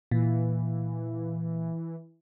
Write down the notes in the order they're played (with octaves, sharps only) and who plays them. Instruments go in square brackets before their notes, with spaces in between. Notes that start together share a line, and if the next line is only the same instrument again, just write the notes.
[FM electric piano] A#2 [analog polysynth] E3